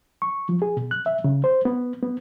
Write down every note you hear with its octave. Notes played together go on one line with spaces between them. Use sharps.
C#6
F3
G#4
B2
F#6
E5
C#3
C5
B3
B3